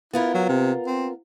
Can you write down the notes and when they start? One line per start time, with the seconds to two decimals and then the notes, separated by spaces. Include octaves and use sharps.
0.13 B3 E4 F4 A#4
0.35 F#3
0.49 C3
0.86 C4